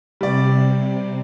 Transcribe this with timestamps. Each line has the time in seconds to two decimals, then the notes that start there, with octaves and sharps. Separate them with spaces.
0.21 C3 G3 D5